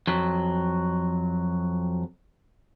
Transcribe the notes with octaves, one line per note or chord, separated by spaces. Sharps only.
F2 F#3